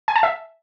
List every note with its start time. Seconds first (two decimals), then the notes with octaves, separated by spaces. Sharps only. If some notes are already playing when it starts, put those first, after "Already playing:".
0.08 G#5
0.16 A5
0.23 E5